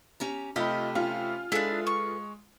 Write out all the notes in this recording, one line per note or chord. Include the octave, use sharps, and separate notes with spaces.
C#4 G4 A#5
C3 A3 F4 G4 D#5 B5
C#4 F4 F5
G#3 D4 E4 G#4 A4 B4
C#6